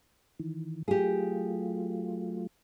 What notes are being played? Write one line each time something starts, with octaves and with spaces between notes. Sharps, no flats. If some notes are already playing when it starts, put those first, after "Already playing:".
D#3 E3
F#3 A3 F4 G4 G#4